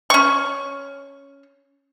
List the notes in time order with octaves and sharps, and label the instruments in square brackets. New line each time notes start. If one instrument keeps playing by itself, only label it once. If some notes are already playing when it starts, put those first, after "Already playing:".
[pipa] C#4 C#6